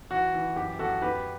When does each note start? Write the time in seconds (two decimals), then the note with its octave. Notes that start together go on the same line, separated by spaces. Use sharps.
0.10 E3 F#4
0.34 E3
0.56 F#2 G4
0.79 F#2 F#4 A4
1.01 B3 G4 B4